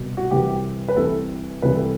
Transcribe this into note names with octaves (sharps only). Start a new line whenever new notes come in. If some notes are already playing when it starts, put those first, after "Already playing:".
Already playing: C2 B2
F#4
C2 C3 E3 G4
B4
C2 C3 E3 A4
C2 C3 E3 B4
A4